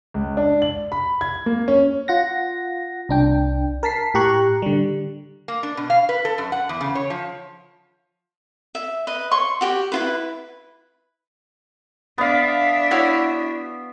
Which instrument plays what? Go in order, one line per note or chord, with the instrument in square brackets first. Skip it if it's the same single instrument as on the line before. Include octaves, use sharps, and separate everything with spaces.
[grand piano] C#2
D4
F#7
B5
G#6
A#3
C#4
[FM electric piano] F4 F#5 A#6
C2 D4 G5
A#4 A5 B6 C7
A2 G4 A#5 C#6 F#6
D3 G3
[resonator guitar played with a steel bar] A#3
D4
B2
F5
B4
A4
F#2
F#5
E2
C#3
C#5
F3
[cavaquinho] E5
B4 D#5
C#5 C6 C#6
F#4 G4
E4 F4 B4
[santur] B3 F5 [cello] D4 E5
[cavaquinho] E4 F#4 C#5